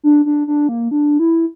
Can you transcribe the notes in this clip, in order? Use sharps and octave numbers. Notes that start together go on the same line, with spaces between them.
D4
D4
D4
A#3
D4
E4